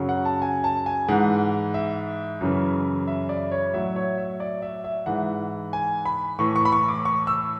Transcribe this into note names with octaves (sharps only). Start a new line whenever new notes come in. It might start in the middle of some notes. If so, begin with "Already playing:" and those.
Already playing: F#2 C#3 F#3
F#5
A5
G#5
A5
G#5
G#2 E3 F#5
E5
F#2 C#3 E3
E5
D5
C#5
A2 F#3 E5
C#5
E5
D5
E5
E5
G#2 E3 F#5
G#5
B5
A2 E3 C#6
C#6
B5
C#6
D6
C#6
E6